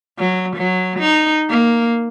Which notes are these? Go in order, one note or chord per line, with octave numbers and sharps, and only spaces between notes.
F#3
F#3
D#4
A#3